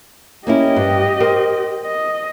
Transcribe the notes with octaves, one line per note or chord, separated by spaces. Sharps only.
A#3 C#4 E4 G4 D#5
G2
A#4 C5
D#5